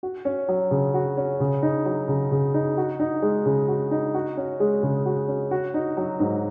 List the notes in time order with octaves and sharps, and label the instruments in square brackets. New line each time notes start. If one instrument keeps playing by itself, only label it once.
[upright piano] F#4
C#4
F#3
C#3
F#4
C#4
C#3
D#4
F#3
C#3
C#3
D#4
F#4
D#4
G#3
C#3
F#4
D#4
F#4
C#4
G#3
C#3
F#4
C#4
F#4
D#4
F#3
G#2